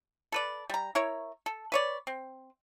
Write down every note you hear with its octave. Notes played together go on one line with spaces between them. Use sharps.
A4 B4 D5
G3 A#5
E4 A#4 C#5
A4
B4 C#5 D5
C4